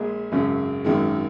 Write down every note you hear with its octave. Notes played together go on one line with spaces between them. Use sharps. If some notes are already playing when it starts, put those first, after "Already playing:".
Already playing: A#1 A#2 G#3 G#4
G#1 F#2 C#3
G#1 F#2 D#3 G#3